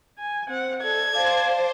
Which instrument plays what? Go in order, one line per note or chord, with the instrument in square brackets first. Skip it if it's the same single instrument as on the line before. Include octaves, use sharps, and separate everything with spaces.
[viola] G#5
C4 F#5
[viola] A4 [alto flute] D5 [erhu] G#6
[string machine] C5 [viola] D5 A5 [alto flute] F5